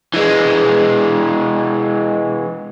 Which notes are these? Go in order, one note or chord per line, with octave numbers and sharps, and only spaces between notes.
E3 G#3